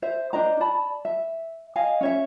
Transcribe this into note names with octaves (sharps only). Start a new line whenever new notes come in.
C5 E5
D4 C5 D#5 A#5
D5 A5 B5
E5
D#5 F5 G#5
C#4 C#5 E5